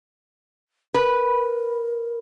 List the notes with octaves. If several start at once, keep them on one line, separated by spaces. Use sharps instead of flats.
A#4 B4